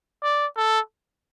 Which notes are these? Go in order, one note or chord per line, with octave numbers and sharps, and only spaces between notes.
D5
A4